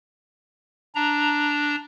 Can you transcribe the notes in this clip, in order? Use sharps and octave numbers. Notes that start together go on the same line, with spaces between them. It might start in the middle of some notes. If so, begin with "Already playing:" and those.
D4 A#5